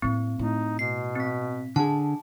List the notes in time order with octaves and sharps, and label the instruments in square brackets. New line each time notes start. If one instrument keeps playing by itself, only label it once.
[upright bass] A2 A#3 [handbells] C4
[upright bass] A2 [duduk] D#4
[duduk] B2 [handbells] C7
[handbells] C4 B6
[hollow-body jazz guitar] D3 G#4 [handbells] A5